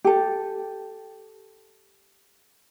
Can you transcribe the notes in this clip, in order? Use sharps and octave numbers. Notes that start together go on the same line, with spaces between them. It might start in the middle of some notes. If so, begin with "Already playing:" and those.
G4 A4